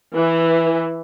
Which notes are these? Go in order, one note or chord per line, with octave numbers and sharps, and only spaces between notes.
E3